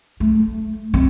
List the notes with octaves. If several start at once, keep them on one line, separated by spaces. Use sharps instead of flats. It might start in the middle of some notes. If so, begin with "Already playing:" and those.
A3
C4